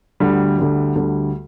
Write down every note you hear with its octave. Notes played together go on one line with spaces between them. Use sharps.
D2 D3 G3
D2 D3 G3
D2 D3 G3